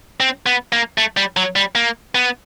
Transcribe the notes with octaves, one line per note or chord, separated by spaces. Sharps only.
C4
B3
A#3
A3
G3
F#3
G3
A#3
B3